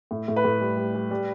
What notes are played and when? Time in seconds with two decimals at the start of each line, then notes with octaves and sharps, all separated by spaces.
0.11 A2
0.28 A2
0.36 B4
0.44 A2
0.61 G3
0.77 G3
0.95 G3
1.11 G3